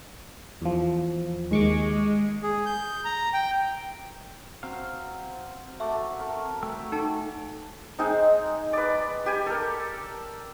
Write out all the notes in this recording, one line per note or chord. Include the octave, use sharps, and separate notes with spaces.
E2 F3
D#2 G#3 C#6 D6
G#4
G6
A#5
G5
F#3 C4 F5
A3 F#4 E5 D6
A4 A#4 C#6
A3 B4 C#5 G5 E6
D#4 A4 A5
G#3 C4 D#4
B4 D5
G4 G#5
A4 A#4